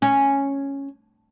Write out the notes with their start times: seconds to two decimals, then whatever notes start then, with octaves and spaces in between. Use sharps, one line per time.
0.02 C#4